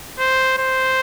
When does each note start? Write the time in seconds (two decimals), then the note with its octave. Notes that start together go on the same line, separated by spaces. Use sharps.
0.19 C5
0.58 C5